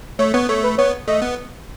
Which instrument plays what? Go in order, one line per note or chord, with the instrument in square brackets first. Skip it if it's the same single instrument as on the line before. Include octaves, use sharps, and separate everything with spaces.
[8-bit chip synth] A3 [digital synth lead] C#5
[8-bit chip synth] B3 [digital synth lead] C#5
[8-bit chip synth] A3 [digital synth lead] C#5
[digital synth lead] B4
[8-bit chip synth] B3 [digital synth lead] C#5
[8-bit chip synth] A3 [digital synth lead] D#5
[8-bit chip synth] B3